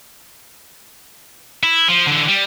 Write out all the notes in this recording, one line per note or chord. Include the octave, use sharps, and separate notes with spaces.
E4
F3
D3 E3
G3